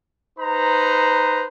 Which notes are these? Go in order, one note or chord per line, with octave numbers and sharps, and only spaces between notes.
D#4 B4 C5 A#5